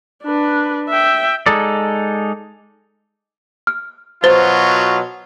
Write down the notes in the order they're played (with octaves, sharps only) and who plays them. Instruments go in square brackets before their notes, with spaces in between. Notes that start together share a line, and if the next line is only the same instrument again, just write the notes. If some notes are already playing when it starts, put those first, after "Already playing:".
[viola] D4 B4
E5 G5
[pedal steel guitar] G#3 D#4 A4 D5
[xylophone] F6
[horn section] B2 F#3 F4 [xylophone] C5 A6 G7